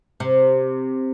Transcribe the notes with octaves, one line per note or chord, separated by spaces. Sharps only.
C3